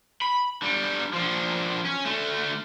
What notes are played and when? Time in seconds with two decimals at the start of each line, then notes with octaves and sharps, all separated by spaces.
0.22 B5
0.62 D3 G3
1.13 F3 D4
1.85 C#4
2.05 D3 A3